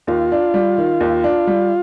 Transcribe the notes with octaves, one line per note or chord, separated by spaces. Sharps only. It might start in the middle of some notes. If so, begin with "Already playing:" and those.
D#2 F4
D4
G3
D#3
D#2
D4
G3